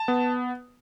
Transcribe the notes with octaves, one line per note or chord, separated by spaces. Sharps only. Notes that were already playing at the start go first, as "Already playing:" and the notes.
Already playing: A5
B3